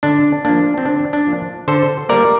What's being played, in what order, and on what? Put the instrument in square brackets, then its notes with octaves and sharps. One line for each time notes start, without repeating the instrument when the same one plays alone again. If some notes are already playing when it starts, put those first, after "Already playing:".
[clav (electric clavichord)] D3 D4
F3 A#3 D4
C4
D3 D4
D4
F3 A#3
D3 A4 C5
G3 A#3 A#4 D5